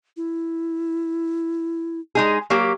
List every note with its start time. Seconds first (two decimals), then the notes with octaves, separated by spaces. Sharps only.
0.17 E4
2.15 G#3 D#4 G#4
2.50 F#3 A#3 G4